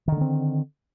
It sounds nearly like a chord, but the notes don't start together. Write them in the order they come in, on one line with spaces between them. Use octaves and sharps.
D#3 D3 A3 C4